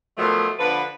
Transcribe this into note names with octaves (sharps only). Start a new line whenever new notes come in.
B2 D#3 F3 F#3 A3
D3 F3 B4